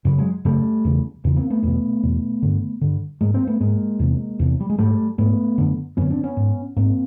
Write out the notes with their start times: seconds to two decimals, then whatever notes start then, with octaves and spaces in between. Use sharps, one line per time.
0.05 F#2 C#3
0.18 F#3 G#3
0.45 F#2 C#3 G3 A3
0.85 E2 C#3
1.24 E2 C#3
1.36 A#3 C4
1.50 A3 B3
1.63 E2 B2 A3 B3
2.03 E2 B2
2.42 G2 D3
2.81 G2 D3
3.21 G#2 G#3 A#3
3.34 A#3 C4
3.47 A3 B3
3.60 G#2 G#3 A#3
4.00 E2 C3
4.39 E2 C3
4.60 G3
4.70 G#3
4.78 G#2 G3 A3
5.18 G#2 A3 B3
5.58 F#2 D3
5.97 F#2 D3 B3 C#4
6.10 C4 D4
6.24 B3 C#4
6.37 G#2
6.77 G#2 A#3 C4